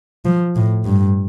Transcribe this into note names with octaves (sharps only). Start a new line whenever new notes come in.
F3
A2
G2